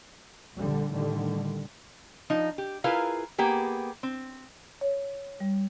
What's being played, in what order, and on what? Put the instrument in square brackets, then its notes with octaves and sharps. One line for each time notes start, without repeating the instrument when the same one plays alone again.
[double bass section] A#1 D3 G3
A2 D3 D#3 G3
[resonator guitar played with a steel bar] F3 D#4
G4
E4 F4 G#4 A#4 B4 F5
A#3 B3 G4 G#4
C4
[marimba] C#5
G3